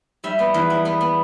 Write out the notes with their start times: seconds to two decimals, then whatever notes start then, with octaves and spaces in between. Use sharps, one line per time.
0.24 G3 E5
0.39 B3
0.54 E2
0.70 G3 F#5
0.85 B3
1.01 B3